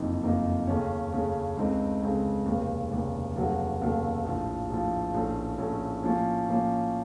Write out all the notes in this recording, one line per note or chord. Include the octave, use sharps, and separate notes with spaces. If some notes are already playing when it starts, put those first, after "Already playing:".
Already playing: F#1 F2 D#3 A#3 D#4
F#1 F2 D#3 A#3 D#4
D#2 C#3 A3 C#4
D#2 C#3 A3 C#4
C#2 C#3 A3 C4 D#4
C#2 C#3 A3 C4 D#4
F1 D#2 C#3
F1 D#2 C#3
F1 D#2 C#3 F#3 A3
F1 D#2 C#3 F#3 A3
A#1 A2 F3
A#1 A2 F3
A#1 A2 A3 C#4
A#1 A2 A3 C#4
A2 F3 A#3 C#4
A2 F3 A#3 C#4